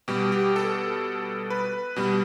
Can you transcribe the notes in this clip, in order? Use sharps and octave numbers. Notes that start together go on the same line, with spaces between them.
B2 G3 G4
G4
A4
B4
B2 G3